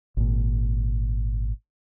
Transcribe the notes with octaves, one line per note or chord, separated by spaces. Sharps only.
G#1 A#2